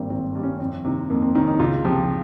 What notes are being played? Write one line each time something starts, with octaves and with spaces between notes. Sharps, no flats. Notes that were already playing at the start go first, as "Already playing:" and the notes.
Already playing: G#1 G2 G3 A#3 C4
G#1 C4
G2 G3
C#4
F2 C4
C3 D#3
F2 A#3
C4
C3 D#3 C#4
D#4
C#2 F4
C3 F3 G4